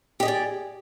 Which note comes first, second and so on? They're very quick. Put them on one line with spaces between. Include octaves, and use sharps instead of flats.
G4 D#5 G#4 D5